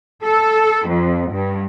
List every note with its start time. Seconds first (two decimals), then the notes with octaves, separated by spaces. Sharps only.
0.25 A4
0.88 F2
1.34 G2